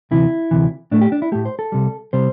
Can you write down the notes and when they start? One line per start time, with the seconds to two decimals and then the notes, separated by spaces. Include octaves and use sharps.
0.11 D2 C3 E3 E4
0.51 D2 C3 E3
0.91 A2 A3 D4
1.01 G4
1.12 D4
1.22 E4
1.32 A2 A3 G4
1.45 C5
1.59 A4
1.72 C2 C3 G3
2.13 C3 G3 C5